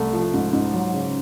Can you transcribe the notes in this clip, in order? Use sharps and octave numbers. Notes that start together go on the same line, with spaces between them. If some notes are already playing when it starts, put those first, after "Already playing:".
Already playing: C2 A3
F3
G#2
G#2
F#3
C#3